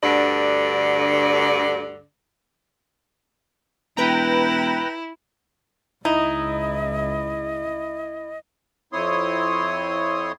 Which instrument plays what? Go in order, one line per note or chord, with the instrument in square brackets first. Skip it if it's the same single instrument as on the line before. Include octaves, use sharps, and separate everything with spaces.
[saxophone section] D2 G2 D3 D5
[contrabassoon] E1 [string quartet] E4 [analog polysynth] B4 G5 A#5
[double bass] C#2 [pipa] D#4 [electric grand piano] E4 [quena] D#5
[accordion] F2 C4 E4 C#5 C6 D#6